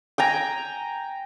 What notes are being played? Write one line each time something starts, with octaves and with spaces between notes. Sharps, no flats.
G5 G#5 A#5